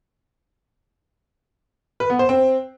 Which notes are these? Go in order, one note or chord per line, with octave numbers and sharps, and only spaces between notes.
B4
B3
C5
C4